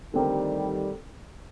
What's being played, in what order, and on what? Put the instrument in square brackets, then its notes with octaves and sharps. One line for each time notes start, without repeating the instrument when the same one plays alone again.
[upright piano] D3 A3 C4 G4 A#4 [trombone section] D#3 G3